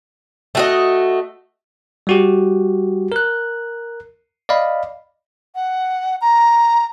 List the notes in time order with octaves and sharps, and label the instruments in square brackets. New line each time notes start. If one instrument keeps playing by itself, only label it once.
[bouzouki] A3 F#4 D#5
[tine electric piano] G3 F#4 G4
A#4 F#6
D5 D#5 F5 B5
[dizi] F#5
A#5